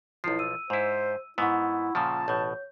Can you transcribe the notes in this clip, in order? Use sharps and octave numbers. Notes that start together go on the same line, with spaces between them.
B1 F3 E4 C7
E6 D#7
G#2 E4 C5
G#2 B3 E4 F#5 C#6 E6
A#2 C#3 F3 A5
A1 B2 C#5 G6